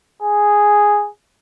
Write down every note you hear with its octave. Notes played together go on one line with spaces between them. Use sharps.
G#4